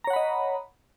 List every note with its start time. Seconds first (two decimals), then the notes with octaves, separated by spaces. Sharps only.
0.04 A#5
0.07 C#5
0.10 F#5
0.13 B5
0.16 D#5